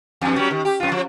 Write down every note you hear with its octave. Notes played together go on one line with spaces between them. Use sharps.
E2 G2
F#3 G3 C#4
D#3
G4
F2 F4
F3